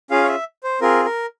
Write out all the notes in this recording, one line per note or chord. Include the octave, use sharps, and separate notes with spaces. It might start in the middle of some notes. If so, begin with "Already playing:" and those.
C#4 F4 G#4 F5
C#5
E5
C5
C4 F4 G#4 A#4
A#4